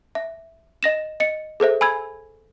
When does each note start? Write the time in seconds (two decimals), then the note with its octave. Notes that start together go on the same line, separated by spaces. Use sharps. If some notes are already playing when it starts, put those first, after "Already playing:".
0.15 E5
0.83 D#5 A#6 E7
1.20 D#5 C#7
1.60 G#4 A4 C5 E5
1.81 G#5 B5 E6 G#6